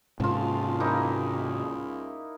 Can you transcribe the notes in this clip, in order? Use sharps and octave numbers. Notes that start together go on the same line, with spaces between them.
C#2 G#2 C3 G#3 F4 A5
A#3 D#4 E4